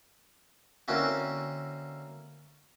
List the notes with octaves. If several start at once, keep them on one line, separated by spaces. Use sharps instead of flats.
D3 A#3 C4 C#4 E4 F#4